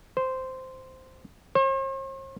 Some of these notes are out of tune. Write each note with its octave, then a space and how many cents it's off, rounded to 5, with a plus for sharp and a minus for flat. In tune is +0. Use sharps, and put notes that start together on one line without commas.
C5 -10
C5 +45